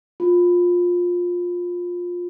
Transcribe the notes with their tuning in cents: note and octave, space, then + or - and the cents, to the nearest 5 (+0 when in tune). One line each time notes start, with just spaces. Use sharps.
F4 +20